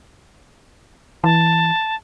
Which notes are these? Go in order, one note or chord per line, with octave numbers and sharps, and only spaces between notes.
E3 A5